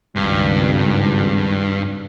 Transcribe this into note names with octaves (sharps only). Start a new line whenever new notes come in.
G#1 C#2 G2